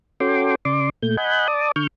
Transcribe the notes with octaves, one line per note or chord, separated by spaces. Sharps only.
C#4 F#4 A4 G5 C6 D6
C#3 D5 C6 D6
A#2 A3 G6
D#5 F#5 G#5 B5 F#6 G6
D5 A5 D6 D#6
D3 C#6 F6 G6